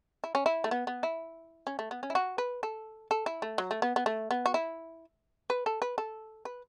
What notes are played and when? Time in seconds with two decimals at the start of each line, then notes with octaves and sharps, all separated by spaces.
0.24 E4
0.35 C#4
0.46 E4
0.64 A3
0.71 B3
0.87 B3
1.03 E4
1.67 C#4
1.79 A3
1.91 B3
2.03 C#4
2.10 E4
2.15 F#4
2.38 B4
2.63 A4
3.11 A4
3.26 E4
3.42 A3
3.58 F#3
3.71 A3
3.82 B3
3.96 B3
4.06 A3
4.31 B3
4.46 F#4
4.54 E4
5.50 B4
5.66 A4
5.82 B4
5.98 A4
6.45 B4